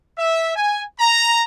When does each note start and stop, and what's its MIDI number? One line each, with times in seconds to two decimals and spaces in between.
0.18 0.56 76
0.56 0.83 80
0.99 1.43 82